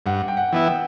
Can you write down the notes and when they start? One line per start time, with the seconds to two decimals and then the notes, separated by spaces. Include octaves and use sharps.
0.06 G2 F#5
0.28 G5
0.37 F#5
0.52 E3 B3 E4
0.67 G5